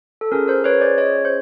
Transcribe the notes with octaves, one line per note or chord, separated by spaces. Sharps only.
A4
C#4 F4 G#4 A#4
A#4 C5
B4 C#5
C5 D5
C#5 D#5
C5